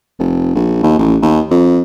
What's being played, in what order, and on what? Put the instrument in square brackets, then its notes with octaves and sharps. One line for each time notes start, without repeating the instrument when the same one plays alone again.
[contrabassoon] F1
A#1
D#2
A1
D#2
F2